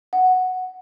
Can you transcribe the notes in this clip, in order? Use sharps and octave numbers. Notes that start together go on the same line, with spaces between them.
F#5